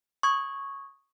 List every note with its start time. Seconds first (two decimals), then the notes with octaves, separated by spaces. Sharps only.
0.23 C#6 D#6 G#6